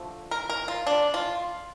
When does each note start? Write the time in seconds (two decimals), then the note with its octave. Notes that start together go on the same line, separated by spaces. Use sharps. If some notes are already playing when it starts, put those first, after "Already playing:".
Already playing: D3 F3 A3
0.31 A#4
0.50 A#4
0.68 F4
0.87 D4
1.14 F4